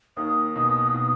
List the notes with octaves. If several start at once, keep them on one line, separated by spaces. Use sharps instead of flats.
D#2 D#3 D#6
B1 B2
B2